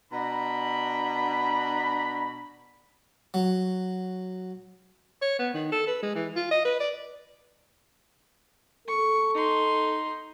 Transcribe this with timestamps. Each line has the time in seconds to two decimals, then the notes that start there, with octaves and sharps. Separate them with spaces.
0.12 B2 D4 A#5 B5
3.34 F#3
5.22 C#5
5.39 B3
5.54 D#3
5.72 A4
5.87 B4
6.02 G#3
6.15 E3
6.36 F4
6.51 D#5
6.65 B4
6.80 D5
8.88 A4 C#6
9.35 D#4 C6